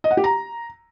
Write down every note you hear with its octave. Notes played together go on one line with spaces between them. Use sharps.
D#5
F#5
G4
A#5